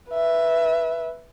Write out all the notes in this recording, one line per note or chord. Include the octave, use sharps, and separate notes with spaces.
B4 E5